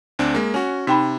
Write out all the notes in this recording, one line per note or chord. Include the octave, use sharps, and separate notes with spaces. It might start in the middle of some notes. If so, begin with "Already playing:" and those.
D2 C4 D4
G#3 A#3
C#4 F#4 G#5
C3 D#4 G5 B5